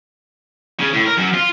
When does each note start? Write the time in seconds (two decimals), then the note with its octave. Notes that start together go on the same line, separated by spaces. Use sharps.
0.79 C#3
0.93 A2
1.06 A#4
1.17 F#2
1.34 F4